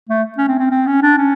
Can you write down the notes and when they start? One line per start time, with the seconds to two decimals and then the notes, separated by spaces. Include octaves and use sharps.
0.09 A3
0.38 C#4
0.48 C4
0.59 C4
0.71 C4
0.87 C#4
1.02 D4
1.17 C#4